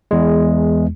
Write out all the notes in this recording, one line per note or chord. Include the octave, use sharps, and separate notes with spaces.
E2 G#3